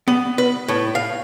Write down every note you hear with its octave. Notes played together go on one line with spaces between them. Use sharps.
B3
B4
A2
F5